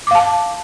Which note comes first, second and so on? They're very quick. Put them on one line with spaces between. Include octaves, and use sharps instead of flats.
D6 F5 A5